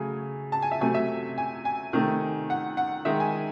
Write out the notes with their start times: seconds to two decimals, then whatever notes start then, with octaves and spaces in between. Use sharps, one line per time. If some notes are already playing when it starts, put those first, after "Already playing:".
Already playing: C#3 F#3 A3 G#5
0.52 A5
0.62 G#5
0.71 E5
0.81 C3 F#3 A3 G#5
0.94 E5
1.38 G#5
1.65 G#5
1.93 C3 D#3 A3
2.50 F#5
2.77 F#5
3.05 D#3 G#3 E5
3.20 G#5